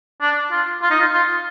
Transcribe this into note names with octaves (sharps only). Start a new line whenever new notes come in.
D4
F4
F4
D#4
F4
F4